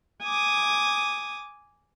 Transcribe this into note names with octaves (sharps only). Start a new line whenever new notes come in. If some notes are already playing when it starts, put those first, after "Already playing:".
G#5 D6 D#6